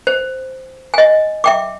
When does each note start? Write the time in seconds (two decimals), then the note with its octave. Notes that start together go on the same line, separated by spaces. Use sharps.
0.07 C5
0.94 D#5 G#5
1.44 E5 G5 D6